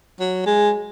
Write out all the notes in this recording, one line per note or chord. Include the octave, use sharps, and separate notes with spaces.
F#3
G#3